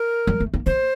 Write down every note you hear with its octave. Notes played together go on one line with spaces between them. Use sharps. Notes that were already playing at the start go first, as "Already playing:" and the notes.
Already playing: A#4
G3
A3
A#3
A#3 C5